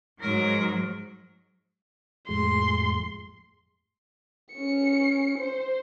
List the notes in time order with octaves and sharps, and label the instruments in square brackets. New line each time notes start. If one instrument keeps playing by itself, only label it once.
[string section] G#2 F#3 [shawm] A#4
[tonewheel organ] F2 A2 G#3 [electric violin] C6
[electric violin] C#4 C#7
C5